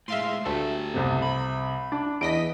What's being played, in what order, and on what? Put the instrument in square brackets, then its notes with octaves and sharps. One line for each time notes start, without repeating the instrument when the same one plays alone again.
[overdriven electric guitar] A2 G#3 [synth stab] E5 F5 C6
[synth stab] D2 A3 [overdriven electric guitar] G4 A4
[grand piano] C2 C3
[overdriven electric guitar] B5
[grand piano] D4
[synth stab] E2 D#5 B6 [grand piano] A#6 D7